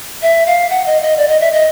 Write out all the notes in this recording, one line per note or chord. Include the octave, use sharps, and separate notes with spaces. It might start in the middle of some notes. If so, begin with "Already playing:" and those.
E5
F5
F#5
D#5
D#5
D5
D#5
E5
D#5